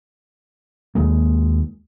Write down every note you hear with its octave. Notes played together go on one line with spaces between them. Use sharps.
D#2 G#3 A#3